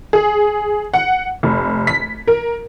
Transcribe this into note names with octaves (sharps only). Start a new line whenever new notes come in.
G#4
F#5
F1
B6
A#4